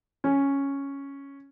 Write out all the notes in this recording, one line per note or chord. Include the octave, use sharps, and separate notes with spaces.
C#4